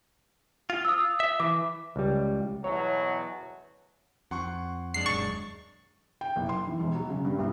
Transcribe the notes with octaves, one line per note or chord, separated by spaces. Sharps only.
F4
D#6 E6
E5
E3 D6
C#2 G3
E2 B2 F#3 C#5
F2 F#5 C6 C#6
F#2 G#3 D4 C7
D#1 C#6 A6
G5
F#1
C6
E3
E1
F#3
C#3
G2
C2